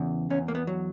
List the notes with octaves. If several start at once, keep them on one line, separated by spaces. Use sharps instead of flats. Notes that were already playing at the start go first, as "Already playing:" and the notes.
Already playing: E2 C#3
E2 C#4
A#3
B3
F#3